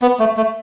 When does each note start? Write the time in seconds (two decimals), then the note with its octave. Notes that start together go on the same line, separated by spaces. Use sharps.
0.02 B3
0.20 A3
0.37 A3